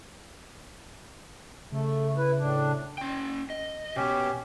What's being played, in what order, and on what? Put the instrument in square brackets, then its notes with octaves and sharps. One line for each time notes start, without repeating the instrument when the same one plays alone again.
[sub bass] C#3 [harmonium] A3
[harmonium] E4 B4
A2 D4
[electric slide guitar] C#4 G5
D#5
[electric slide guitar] B2 B3 [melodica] C#4 G4